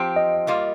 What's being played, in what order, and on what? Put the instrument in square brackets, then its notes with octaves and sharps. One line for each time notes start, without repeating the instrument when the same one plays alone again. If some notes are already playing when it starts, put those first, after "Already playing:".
Already playing: [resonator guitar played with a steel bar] F3 C4 G4
[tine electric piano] D#5
[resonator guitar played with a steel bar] G3 A#3 F4